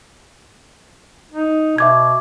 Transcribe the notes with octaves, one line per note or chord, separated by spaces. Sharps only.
D#4
B2 E5 D6 G#6